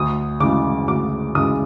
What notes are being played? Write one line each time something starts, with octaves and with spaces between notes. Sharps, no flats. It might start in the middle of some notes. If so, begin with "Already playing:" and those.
Already playing: D2 D#6
C#3 E3 G#3 D6
D2 D6
C#3 E3 G#3 D#6